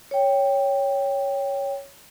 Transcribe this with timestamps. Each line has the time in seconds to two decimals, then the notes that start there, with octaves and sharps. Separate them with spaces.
0.11 C#5 G5